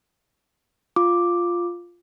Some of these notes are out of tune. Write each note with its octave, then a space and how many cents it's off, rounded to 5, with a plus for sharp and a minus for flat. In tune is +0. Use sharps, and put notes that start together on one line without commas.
F4 +0 D6 +0